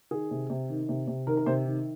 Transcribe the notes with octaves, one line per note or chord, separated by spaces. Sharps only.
D#3 G#4
C3
C3
D#3
C3
C3
D#3 A#4
A#4
C3 C5
D#3